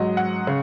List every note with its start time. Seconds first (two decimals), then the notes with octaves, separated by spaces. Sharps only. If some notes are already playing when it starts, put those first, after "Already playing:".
Already playing: G#2 F#3 D#5
0.17 F#5
0.47 C#3